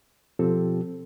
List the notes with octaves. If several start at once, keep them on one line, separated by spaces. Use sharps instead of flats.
B2 F3 C4 F4 G4 A4